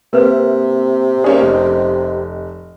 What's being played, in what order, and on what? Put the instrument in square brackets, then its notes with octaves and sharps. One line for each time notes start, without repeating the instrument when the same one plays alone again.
[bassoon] C3 [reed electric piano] A#3 C4 E5 [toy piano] A#4 B4
[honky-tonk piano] A#3 C#4 G#4 [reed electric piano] D5
[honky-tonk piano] F1 [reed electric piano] D#5